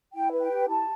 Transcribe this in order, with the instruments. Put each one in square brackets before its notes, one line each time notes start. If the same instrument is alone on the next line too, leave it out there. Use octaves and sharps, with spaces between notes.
[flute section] E4 G5
B4
G5
G4
E4 A5